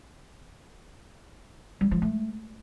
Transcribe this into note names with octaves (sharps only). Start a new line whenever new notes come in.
G3
F3
A3